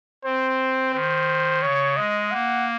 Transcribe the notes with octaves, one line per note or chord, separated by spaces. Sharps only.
C4 C5
D#3 C5
C#3 C#5
G#3 D#5
A#3 F#5